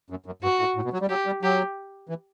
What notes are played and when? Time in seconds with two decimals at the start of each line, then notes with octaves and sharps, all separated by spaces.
0.10 F#2
0.26 F#2
0.42 G2 F#4
0.59 A2
0.76 A2
0.84 B2
0.93 F#3
1.01 G3
1.09 F#3 G4
1.26 G3
1.43 F#3 G4
2.09 E3